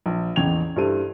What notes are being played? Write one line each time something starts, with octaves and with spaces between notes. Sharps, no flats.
A#1
A1 E2 C#3 G5 G#6 F7
G2 G3 E4 A4 C5 D#7